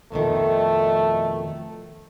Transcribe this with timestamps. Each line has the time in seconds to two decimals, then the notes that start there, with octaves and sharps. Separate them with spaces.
0.12 F2 B2 D#3 A3